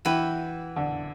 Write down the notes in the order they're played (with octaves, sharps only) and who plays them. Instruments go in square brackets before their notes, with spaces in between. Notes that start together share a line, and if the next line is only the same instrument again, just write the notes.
[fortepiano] E3 [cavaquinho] F#4 B4 E5 G5
[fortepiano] D3